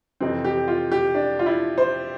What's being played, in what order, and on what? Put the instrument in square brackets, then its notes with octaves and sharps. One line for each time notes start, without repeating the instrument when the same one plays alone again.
[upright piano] F2 C3 E3 C4
G4
F4
G4
D4
F4
E4
C5